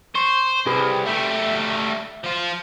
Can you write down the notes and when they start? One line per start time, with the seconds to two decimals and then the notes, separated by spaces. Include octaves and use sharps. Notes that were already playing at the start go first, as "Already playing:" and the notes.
0.15 C5 C#6
0.66 C2 G4 G#4 B4
1.06 G3 A3 E5
2.24 F3 F4